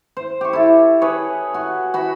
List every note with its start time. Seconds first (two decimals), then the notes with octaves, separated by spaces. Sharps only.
0.17 C5
0.41 G4 C#6
0.53 E4 A4
1.01 G#4 B4 C#5
1.54 F#4
1.94 F#4 B5